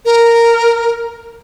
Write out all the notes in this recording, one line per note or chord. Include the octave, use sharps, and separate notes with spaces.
A#4